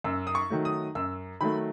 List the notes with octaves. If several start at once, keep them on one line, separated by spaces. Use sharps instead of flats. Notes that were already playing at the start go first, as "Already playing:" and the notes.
F#2 E6
D#6
C#6
D#3 F#3 A3
D#6
F#2 E6
D#3 F#3 A3 B5